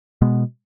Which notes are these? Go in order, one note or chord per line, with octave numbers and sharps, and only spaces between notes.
B2 G#3 B3